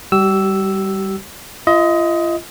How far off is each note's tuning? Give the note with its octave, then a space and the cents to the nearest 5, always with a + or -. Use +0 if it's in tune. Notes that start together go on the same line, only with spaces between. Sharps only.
G3 +0 G4 -40 E6 +0
F4 -35 D#5 +20